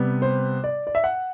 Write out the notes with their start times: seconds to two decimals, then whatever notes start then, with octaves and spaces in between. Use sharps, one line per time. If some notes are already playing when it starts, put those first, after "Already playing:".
Already playing: C3 G3 B3
0.22 C5
0.64 D5
0.87 D5
0.95 E5
1.04 F#5